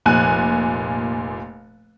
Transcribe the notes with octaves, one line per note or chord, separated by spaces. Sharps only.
F1 A#2 G#5 F#6